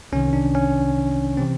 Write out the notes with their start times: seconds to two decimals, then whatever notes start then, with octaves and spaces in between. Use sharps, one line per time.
0.12 C2 C3 D#3 C#4
0.33 D4
0.55 C#4
1.37 C3 E3 C4